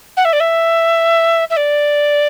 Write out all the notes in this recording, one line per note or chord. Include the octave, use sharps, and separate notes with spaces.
F#5
E5
D5
E5
E5
D5